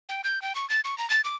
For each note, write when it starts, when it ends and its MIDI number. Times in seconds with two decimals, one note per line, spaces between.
0.09 0.21 79
0.24 0.42 91
0.42 0.55 79
0.55 0.68 85
0.70 0.81 93
0.85 0.98 85
0.98 1.08 82
1.10 1.21 93
1.24 1.36 86